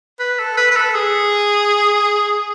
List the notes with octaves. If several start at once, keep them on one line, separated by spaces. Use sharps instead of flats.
B4
A4
B4
B4
A4
G#4